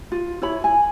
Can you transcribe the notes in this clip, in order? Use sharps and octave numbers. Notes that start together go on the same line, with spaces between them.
F4
E4 C#5 B5
G#5